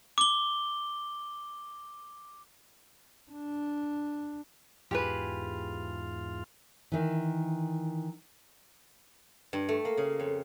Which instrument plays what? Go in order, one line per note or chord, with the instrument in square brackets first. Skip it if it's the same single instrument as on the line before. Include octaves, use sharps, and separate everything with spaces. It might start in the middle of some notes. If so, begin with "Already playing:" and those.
[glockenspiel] D6 G7
[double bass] D4
[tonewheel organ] E2 G#2 F4 [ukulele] G4 G#4 B4
[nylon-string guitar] D#3 E3
[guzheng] G2
A3
A#3
C#3
F2